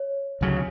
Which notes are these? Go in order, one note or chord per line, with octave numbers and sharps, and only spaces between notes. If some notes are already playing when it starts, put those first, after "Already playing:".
Already playing: C#5
D2 C#3 F#3